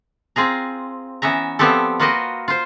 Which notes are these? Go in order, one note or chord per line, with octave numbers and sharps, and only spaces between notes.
C4 F4 G#4 A#5
E3 B3 C#4 E5 A#5
F3 G3 B3 C4 G4 A4
A#3 F4 F#4 B4 D#5 G5
F4 C5